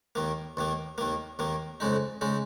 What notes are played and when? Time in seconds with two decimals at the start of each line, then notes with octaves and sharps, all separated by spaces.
0.15 D#2 D#3 A#3
0.57 D#2 D#3 A#3
0.98 D#2 D#3 A#3
1.39 D#2 D#3 A#3
1.80 F2 C#3 G#3 D#4
2.21 C#3 G#3 D#4